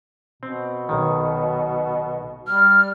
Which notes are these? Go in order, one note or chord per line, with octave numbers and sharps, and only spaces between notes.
B2 C4
B1 D#3
G3 F6